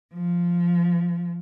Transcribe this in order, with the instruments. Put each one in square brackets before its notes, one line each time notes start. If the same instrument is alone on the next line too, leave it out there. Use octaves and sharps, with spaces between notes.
[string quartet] F3